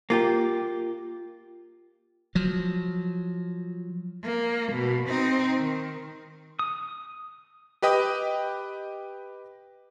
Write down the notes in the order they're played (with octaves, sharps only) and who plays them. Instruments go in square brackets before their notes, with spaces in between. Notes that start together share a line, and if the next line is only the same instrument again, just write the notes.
[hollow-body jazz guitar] A#3 F4 G4
[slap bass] F3 F#3
[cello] A#3
B2
C4 D#4
D#3
[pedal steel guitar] D#6
[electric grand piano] G4 B4 D#5 G5 D#6